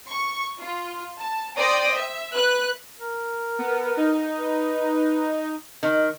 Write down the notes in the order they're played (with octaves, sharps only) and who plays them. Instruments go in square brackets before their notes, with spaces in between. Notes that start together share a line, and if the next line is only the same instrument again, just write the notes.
[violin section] C#6
F4
A5
C5 D5 G5 D#6 A#6
E5
B4 F#6
[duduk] A#4
[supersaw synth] B3
D#4
[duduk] B4
[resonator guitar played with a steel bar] D#3